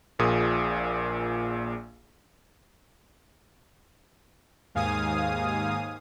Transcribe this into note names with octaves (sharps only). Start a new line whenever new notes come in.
A#1 A#2 G#4 D#6
D#2 G#2 F5 G#5 D#6